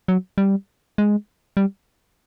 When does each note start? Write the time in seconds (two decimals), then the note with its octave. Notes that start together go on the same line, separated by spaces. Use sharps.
0.08 F#3
0.38 G3
0.98 G#3
1.57 G3